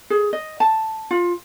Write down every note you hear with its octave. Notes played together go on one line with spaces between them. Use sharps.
G#4
D#5
A5
F4